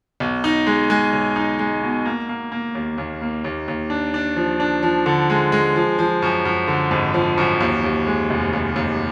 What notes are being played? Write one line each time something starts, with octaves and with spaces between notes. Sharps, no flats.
B1
D#4
G#3
G#3
B1
D#4
G#3
B2
A#3
A#3
A#3
D#2
D#2
A#3
D#2
D#2
D4
D4
F3
D4
F3
D3
G#3
G#3
F3
F3
F#2
F#2
D3
G#1
F3
F#2
D#2
D#2
G#3
F1
D#2
D#2